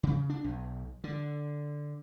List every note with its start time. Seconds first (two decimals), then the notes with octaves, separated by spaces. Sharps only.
0.03 C#3
0.30 D4
0.44 B1
1.04 D3